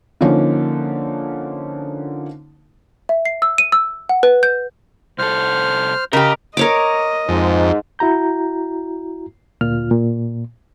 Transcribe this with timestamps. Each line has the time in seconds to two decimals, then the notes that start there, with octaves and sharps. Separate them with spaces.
0.21 D3 F3 A#3 C#4 D#4
3.09 E5
3.26 C7
3.42 E6
3.58 D#7
3.72 E6
4.09 F#5
4.23 B4
4.43 G6
5.18 C2 A4 C5 F6
6.13 C#3 G4 A#4 D#5
6.57 A#4 C#5 D#5 D6
7.28 F2 G#2
7.99 E4 F#4 A#5 G6
9.61 D2 A#2 F4 F6
9.91 A#2